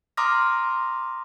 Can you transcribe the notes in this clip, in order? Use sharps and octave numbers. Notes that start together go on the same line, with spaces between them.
A#5 C6 D6 D#6 F6 A#6